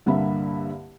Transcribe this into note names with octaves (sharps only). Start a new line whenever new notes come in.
C2 G2 D3 A#3 E5 B5